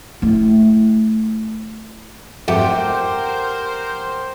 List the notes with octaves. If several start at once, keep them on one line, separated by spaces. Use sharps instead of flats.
A3 E4
F2 G#2 A3 G4 A#4 C5 F#5 G5